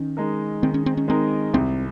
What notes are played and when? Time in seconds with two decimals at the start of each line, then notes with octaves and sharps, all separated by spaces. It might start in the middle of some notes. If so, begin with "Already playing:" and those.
Already playing: D#3 C#4
0.17 G#3 D#4 A#4
0.63 D#3 C4
0.74 C#4
0.86 C4
0.97 C#4
1.08 G#3 C4 D#4 A#4
1.54 C2 C4